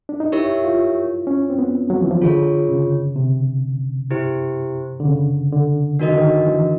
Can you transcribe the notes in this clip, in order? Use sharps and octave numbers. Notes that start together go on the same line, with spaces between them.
D4
D#4
E4 G4 A#4 C#5 E5
F4
C#4
C4
B3
F#3
F3
E3
F3
D3 F4 G#4 C#5
C#3
C3
E4 G4 C5
D3
C#3
D3
D#3 D4 F#4 A#4 D#5
D3
D#3
E3